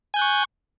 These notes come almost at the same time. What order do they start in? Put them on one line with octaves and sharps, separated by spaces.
G#5 G6 F#6 C#6